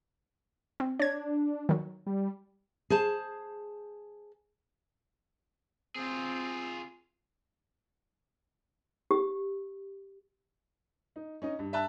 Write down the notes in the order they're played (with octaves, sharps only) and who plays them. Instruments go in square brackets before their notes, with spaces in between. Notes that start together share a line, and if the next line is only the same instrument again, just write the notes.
[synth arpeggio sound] C4
[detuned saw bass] D4 [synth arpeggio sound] C#5 G#6
[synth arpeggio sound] D#3 F#3
[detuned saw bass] G3
[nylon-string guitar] G#4 C5 A5
[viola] C4 [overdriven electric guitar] F4 G#4
[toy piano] G4
[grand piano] D#4
C#4 D#4 D#5
G2
[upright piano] E5 A5 F#6